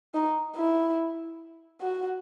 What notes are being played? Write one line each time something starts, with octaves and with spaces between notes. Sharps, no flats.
D#4
E4
F#4